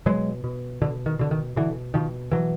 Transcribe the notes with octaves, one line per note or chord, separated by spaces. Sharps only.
B2 F#3 G#3
B2
B2 D3
D#3
B2 D3
D#3
B2 D3 E3
B2 D#3 F3
B2 E3 F#3